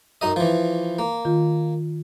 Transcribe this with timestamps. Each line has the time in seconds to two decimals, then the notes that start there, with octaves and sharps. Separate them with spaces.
0.21 F#2 D#4 D#5
0.36 E3 F3
0.99 A#3
1.25 D#3 F4